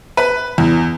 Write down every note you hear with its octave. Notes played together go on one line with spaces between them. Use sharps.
B4
E2